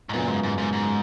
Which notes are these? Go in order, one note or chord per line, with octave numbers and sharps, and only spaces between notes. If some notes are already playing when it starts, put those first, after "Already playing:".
G#2
F#2 A#2 C#3 F#3 B3 F4
G#2
G#2
G#2
G#2